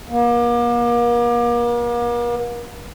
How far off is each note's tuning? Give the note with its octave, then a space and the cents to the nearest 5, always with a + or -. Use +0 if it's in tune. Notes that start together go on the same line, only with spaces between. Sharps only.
A#3 +40